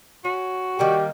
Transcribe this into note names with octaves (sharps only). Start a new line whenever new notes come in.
C#4 F#4
D#3 G3 A#3 G4